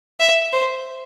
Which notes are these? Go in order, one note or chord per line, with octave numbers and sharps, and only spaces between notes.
E5
C5